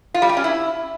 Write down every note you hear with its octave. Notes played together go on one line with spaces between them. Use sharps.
F4
G3
G4
C#4
E4